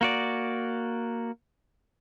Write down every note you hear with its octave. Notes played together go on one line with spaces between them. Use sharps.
A#3 F#4 D5